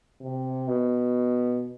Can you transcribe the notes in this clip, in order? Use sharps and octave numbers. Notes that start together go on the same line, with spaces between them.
C3
B2